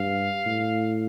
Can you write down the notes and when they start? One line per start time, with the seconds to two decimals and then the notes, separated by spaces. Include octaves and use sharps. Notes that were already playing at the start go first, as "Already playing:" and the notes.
Already playing: G2 F5
0.46 A2